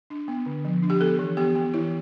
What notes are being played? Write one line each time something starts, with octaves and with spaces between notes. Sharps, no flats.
D4
B3
D3
F3
D4
G4
B3 A4
E3
B3 G4
B3
E3 E4